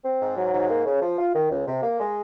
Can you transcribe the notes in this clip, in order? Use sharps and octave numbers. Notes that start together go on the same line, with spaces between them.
C4
G#2
F#3
G#2
A#3
C#3
F3
F4
D#3
C#2
C3
A#3
G#3